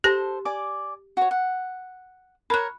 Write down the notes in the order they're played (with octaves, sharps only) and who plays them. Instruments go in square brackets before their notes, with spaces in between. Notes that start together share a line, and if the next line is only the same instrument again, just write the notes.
[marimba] G4 A#6 [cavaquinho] A4 C5 A5
[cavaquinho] D5 G#5 D6
F#4 C#5
F#5
[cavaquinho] A#4 C#5 [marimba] B5 F#6